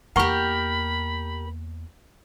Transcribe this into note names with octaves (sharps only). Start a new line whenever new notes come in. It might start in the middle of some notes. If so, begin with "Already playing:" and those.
E2 A#3 G4 A#4 F#5 B5 C#6